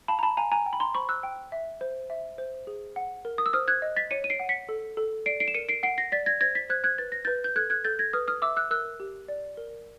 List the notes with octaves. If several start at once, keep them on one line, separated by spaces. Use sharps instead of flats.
F5 A5 B5
A#5
A5 B5
F5 G#5 A#5
G#5 A#5
G5
B5
A#5 C6
C5 B5 C#6
E6 F#6
G5
E5
C5
E5
C5
G#4
F#5
A#4
D#6
E6
C5 D#6 F6
F#6 G#6
D#5
A6 B6
C#5 C#7 D#7
D#7
C7 D7
F#5
B6 C#7
A4
A4
D5 C7 D7
C7 D7
E7
A#4 C#7 D#7
C7 D7
F#5 C7 D7
A#6 C7
D5 A6 B6
G#6 A#6
C5 G#6 A#6
A6 B6
C5 F#6 G#6
F#6 G#6
B4 A6
A#6
B4 G6 A6
G6
A4 F#6 G#6
F#6 G#6
A4 G6 A6
G#6 A#6
B4 D#6 F6
D#6 F6
E5 D6 E6
E6 F#6
A#4 E6 F#6
G4
D5
A#4